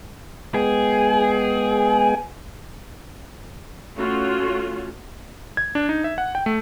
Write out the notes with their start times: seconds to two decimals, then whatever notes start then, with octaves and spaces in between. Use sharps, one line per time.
0.54 G#3 B3 G#4 G5
3.96 A3 C#4 F4 F#4
5.57 G#6
5.75 D4
5.89 D#4
6.04 E5
6.18 F#5
6.35 G5
6.46 A3